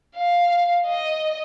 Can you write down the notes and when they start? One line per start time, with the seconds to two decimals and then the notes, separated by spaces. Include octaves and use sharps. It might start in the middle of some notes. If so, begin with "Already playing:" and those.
0.16 F5
0.87 D#5